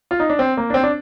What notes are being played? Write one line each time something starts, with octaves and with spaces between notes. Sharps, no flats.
F4
D#4
D4
C4
A#3
D4
C4
D4